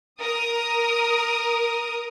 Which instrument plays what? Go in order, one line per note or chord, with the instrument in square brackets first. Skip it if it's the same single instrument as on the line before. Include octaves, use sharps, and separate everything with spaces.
[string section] A#4 D#6